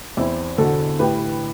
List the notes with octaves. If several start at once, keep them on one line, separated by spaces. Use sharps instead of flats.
E2 C4 E4
D3 F#4 A4
A2 G4 B4